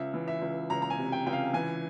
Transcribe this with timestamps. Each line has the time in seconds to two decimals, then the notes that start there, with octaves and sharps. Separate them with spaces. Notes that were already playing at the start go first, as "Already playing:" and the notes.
Already playing: C#2 E5
0.14 E3
0.28 E5
0.41 C#2
0.70 C#2 A#5
0.82 A#5
0.90 G#5
0.98 C3
1.12 G5
1.26 C#2 G5
1.33 F5
1.53 E3 G#5